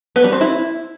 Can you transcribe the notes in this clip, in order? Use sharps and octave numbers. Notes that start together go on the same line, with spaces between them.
B3
G3
C4
E4